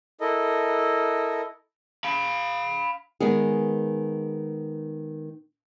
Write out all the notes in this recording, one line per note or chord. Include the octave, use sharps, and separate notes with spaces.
E4 A4 A#4 D#5
F5 B5
D#3 G#3 B3 G#4